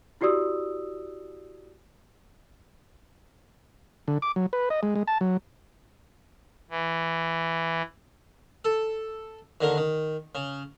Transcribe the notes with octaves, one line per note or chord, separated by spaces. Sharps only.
E4 F#4 G4 D5 D#6 E6
D3
D6
F#3
B4
D#5
G#3
G#3
A5
F#3
E3
A4
D#2 D3 A#4
D#3
C#3